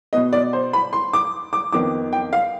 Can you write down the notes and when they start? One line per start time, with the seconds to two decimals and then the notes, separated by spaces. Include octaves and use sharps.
0.13 B2 B3 D#5
0.33 D5
0.53 C5
0.73 B5
0.93 C6
1.13 D6
1.53 D6
1.72 F2 D#3 B3 D6
2.13 G5
2.33 F5